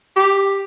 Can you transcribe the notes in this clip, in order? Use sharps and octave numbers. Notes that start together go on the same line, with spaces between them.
G4